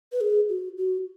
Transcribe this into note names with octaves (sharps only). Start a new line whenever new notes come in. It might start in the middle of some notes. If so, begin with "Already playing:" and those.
B4
G#4
F#4
F#4